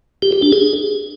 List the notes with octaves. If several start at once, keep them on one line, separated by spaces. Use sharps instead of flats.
G4
G4
D4
G#4